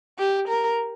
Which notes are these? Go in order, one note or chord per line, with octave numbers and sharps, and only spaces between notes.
G4
A#4